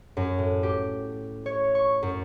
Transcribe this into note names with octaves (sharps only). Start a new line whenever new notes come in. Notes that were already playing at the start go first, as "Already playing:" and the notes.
F#2
A2
G4
C#5
C#6
F#2